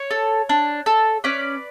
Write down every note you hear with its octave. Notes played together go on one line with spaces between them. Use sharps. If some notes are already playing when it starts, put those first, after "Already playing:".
Already playing: C#5
A4
D4
A4
C#4 B4 D5